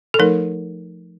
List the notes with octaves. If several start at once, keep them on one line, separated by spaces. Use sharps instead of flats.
A4
F3 A3 D#4 A#4